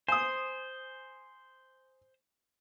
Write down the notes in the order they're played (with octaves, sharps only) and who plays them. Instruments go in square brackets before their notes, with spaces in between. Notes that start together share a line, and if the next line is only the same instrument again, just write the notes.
[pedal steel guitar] C5 [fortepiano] G#5 D#6